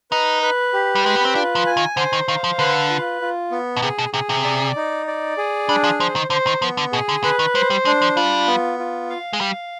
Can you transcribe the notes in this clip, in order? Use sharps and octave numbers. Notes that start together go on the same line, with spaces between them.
D#4 B4
B4
G4
G3
G#3 B4
B3
C4
D4 F4
F3
G#5
D#3
D3 C5
D#3
D#3 F5
F3
D3 B4
F4
F4
B3
B2
C3 G#4
B2
C3 G#4
C3
D5
D#4
D5
G#4
G3 D4
F3
F3 C5
D#3
D3 C5
D#3
F3 B3
D3
B2 G#4
D3
D3 B4
D#3
G3 C5
G3
G#3 D4
F3
G3 F4
B3
F4
F5
G#3
G3 F5